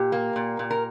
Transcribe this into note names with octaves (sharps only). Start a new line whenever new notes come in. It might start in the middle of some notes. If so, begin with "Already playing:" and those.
Already playing: A#2 G4
A#3
A#2
A#2
A#4